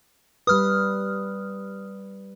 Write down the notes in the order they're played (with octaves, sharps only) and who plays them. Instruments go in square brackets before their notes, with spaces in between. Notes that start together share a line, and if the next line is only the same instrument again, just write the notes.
[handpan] G3 B4 [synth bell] D#6 F6